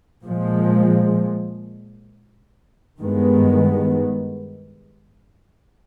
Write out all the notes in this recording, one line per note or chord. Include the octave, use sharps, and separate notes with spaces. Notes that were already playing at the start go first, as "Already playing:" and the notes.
A#2 F3 G#3
G2 D#3 G#3 B3